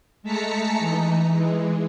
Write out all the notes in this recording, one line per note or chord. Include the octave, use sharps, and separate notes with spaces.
G#3 A3 A5 A#5 B6 C#7
E3 D#4
E3 G#3